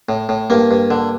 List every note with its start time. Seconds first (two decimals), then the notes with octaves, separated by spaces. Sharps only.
0.09 A2
0.29 A2
0.50 G2 A#3
0.71 G2
0.91 D3